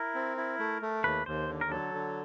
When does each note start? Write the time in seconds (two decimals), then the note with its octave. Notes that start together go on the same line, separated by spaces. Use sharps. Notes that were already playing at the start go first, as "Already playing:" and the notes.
Already playing: E4 A#4
0.15 C4
0.37 E4
0.59 A3
0.82 A3
1.04 D#2 B4
1.26 D#2 C5
1.49 D3
1.61 A#4
1.71 F#3 A4
1.94 D3